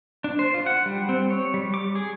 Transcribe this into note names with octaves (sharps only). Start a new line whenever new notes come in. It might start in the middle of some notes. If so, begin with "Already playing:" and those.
D4
C5
F4
F#5
G3
C4
C#5
G3
D6
G#4